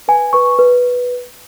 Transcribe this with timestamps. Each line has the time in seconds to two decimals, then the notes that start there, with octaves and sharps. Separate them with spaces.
0.08 B4 G#5
0.33 B4 C#6
0.59 B4